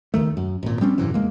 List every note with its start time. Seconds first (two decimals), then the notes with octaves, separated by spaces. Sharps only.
0.14 D#2 D#3 A3
0.37 F#2
0.63 G#1 A#2
0.81 G3 C4 C#4
0.98 G#1 F#2 C3 E3
1.14 E2 G#3 A#3